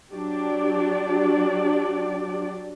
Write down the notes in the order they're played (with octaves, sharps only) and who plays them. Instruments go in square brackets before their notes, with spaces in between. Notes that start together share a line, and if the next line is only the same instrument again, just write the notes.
[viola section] F#3 D4 F#4 G4 D5